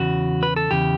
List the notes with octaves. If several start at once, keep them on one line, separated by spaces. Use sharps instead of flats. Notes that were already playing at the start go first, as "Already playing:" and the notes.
Already playing: E2 C#3 F#4
B4
A4
E2 C#3 G4